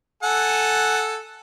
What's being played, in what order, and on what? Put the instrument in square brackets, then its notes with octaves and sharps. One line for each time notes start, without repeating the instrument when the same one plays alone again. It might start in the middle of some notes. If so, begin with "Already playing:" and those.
[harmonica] A4 F#5 G#5